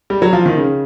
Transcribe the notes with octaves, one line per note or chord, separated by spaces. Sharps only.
G3
F#3
F3
D#3
C#3